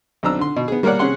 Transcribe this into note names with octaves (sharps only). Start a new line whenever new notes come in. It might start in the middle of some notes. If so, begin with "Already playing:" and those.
B1 C4 D4 A#5 E6
D3 C6
B2
B3 G#4
G3 A#3 A#4 C#5 D5 F#5
C3 C#4 G#4 F#5 C6